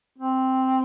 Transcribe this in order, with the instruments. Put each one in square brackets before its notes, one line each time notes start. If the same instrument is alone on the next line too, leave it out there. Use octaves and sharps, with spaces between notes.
[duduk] C4